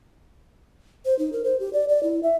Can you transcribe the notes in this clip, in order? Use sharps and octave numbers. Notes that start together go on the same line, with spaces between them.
C5
D#4
A#4
C5
G4
D5
D5
E4
E5